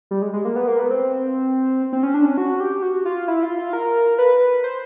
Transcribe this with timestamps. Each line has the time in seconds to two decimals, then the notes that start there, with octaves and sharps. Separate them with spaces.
0.11 G3
0.22 G#3
0.33 G#3
0.45 A#3
0.56 B3
0.68 A#3
0.79 B3
0.90 C4
1.93 C4
2.03 C#4
2.14 D4
2.25 C#4
2.38 F#4
2.60 G4
2.82 F#4
3.05 F4
3.28 E4
3.43 F4
3.59 F4
3.73 A#4
4.18 B4
4.64 C5